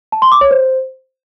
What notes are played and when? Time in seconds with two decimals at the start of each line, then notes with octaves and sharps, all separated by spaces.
0.12 A5
0.22 C6
0.32 D6
0.41 C#5
0.51 C5